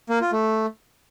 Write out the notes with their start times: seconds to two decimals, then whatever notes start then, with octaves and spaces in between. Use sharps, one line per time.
0.10 A#3
0.21 F4
0.32 A3